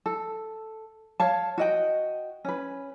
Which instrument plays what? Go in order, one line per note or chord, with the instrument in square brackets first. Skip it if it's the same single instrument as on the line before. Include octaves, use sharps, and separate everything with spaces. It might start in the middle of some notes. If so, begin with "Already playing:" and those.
[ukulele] A4
C#5 F5 A5
F#4 D#5 G5
C#4 B4